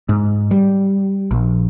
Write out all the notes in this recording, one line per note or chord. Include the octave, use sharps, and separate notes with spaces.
G#2
G3
A#1